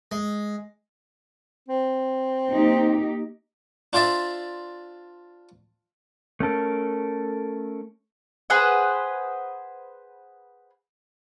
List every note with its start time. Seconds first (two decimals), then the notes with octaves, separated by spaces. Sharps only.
0.12 G#3
1.69 C4
2.50 A#3 D#4 G4
3.93 D4 F4 C5 D5 E5
6.40 A3 C#4 A4 A#4
8.50 G#4 B4 C5 F#5